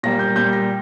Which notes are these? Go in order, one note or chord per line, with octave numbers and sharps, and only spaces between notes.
A#2 G3 A#3 A#6
G6
A#2 G3 A#3 G6
A#6